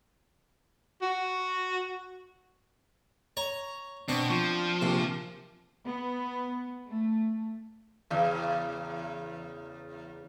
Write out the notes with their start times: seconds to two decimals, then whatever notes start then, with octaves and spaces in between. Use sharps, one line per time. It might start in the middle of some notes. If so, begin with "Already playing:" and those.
1.02 F#4
3.37 C#5 A#5
4.09 B2 C4 D4
4.30 F3
4.82 A#1 C3
5.85 B3
6.87 A3
8.10 E2 C#3